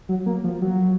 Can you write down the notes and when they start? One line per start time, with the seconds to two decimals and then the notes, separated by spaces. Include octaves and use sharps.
0.09 F#3
0.26 A#3
0.44 F3
0.62 F#3